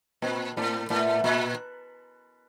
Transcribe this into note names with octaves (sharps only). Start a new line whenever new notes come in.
A#2 C4 D4
A2 A#3 C4
A2 A3 B3
A#2